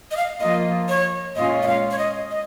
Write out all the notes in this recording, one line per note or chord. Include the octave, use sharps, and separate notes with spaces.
D#5
F5
F3 A#3 F4 D#5
C#5
A#2 G#3 C#4 F4 D#5
D#5
F5
C#5
D#5
D#5